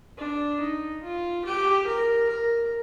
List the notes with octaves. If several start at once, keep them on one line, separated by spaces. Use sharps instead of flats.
D4
D#4
F4
G4
A#4
A#4